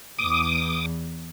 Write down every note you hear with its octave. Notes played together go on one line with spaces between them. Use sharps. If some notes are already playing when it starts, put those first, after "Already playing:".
E2 D6 D#6